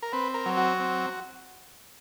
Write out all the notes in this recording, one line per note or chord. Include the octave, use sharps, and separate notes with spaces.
A#4
C4 B4
A#4
F#3
F#4
C4